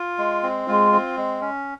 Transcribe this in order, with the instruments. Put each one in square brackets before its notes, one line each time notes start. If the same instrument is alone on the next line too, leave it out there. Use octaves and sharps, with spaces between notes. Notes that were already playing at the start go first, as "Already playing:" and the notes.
Already playing: [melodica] F4
G#3
C4
[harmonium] G#3 [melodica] F4
[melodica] C4
G#3
C#4